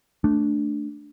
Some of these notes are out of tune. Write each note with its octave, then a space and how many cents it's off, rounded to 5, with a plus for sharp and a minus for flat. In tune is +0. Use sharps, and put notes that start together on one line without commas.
A3 +0 D4 +0